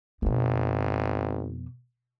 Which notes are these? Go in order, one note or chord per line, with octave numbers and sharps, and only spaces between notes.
G#1 F2 B2